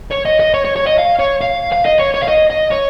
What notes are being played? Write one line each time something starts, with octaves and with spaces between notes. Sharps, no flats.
C#5
D#5
D#5
C#5
C#5
C#5
D#5
F5
C#5
F5
F5
D#5
C#5
C#5
F5
D#5
D#5
C#5